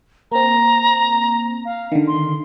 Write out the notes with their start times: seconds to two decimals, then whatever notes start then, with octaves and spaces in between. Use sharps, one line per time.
0.32 A#3 C4 A#5
1.65 F5
1.92 D3 D#3
2.07 C6